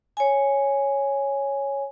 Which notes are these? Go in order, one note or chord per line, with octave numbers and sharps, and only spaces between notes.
C#5 G#5